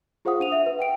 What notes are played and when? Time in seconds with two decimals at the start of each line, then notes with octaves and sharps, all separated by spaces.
0.25 F4 G#4 C5 F5 F#5 D#6
0.40 D4 D#7 F7
0.52 E5
0.66 B4
0.79 F#5 G5 D7